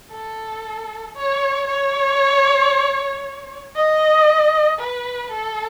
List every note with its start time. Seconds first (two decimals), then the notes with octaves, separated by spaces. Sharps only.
0.11 A4
1.16 C#5
1.67 C#5
3.75 D#5
4.79 B4
5.31 A4